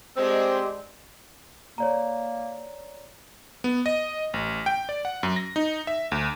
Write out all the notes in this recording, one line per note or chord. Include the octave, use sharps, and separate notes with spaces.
G#3 C4 D4 G4 D#5 C6 E6
A#3 C#5 D5 A#5
B3
D#5
A1
G5
D5
F#5
F#2
A#6
D#4
E5
D2